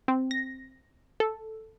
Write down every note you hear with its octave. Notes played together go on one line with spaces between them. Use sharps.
C4
A#6
A4